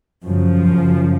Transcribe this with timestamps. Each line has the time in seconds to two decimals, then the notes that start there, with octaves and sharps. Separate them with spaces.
0.24 F#2 C#3 F3
0.67 F#2 C#3